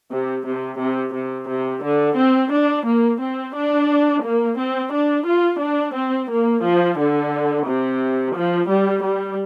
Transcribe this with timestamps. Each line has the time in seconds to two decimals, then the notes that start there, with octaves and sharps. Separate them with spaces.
0.11 C3
0.45 C3
0.79 C3
1.14 C3
1.48 C3
1.83 D3
2.16 C4
2.51 D4
2.85 A#3
3.20 C4
3.54 D4
4.23 A#3
4.57 C4
4.92 D4
5.26 F4
5.60 D4
5.94 C4
6.29 A#3
6.63 F3
6.97 D3
7.66 C3
8.35 F3
8.69 G3
9.03 G3